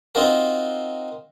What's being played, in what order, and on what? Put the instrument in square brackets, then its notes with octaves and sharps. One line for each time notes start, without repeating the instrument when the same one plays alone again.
[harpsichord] C4 D#4 F4 F#4 A#4